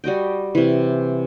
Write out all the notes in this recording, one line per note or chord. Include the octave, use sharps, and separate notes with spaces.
G3 F#4 D#5 G5
C3 E3